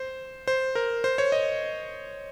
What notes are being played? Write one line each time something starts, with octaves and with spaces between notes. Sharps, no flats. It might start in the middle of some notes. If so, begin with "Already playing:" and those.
Already playing: C5
C5
A#4
C5
C#5
D#5